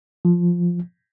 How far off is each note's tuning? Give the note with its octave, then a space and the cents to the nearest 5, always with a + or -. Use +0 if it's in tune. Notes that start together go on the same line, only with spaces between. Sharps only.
F3 +0